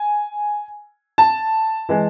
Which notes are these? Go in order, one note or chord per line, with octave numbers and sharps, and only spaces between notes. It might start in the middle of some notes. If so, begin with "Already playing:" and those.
Already playing: G#5
A5
E3 G#3